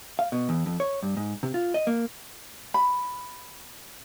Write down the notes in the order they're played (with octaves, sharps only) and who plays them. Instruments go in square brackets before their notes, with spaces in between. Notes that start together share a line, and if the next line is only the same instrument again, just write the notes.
[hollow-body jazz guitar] F5
B2
E2
F2
C#5
G2
G#2
C3
F4
D#5
A#3
[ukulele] B5